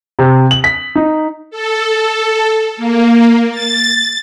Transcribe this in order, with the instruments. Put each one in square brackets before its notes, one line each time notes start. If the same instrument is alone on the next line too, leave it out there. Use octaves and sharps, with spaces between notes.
[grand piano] C3
F#7
B6
D#4
[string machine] A4
A#3
A6